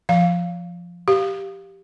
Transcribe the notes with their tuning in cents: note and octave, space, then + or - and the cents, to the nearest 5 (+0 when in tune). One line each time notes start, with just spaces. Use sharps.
F3 +0 F5 +0
G4 +0 F5 +0